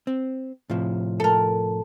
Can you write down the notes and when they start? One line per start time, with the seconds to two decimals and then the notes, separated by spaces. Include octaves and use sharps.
0.07 C4
0.70 A2 C3 F3
1.20 A4 A#4